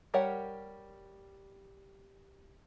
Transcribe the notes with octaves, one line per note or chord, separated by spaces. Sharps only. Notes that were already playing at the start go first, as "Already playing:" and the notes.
G3 G4 A#4 C#5 F#5